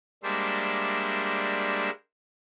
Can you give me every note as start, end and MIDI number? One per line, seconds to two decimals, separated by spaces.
0.23 1.90 55
0.23 1.90 56
0.23 1.90 58
0.23 1.90 62
0.23 1.90 72
0.23 1.90 76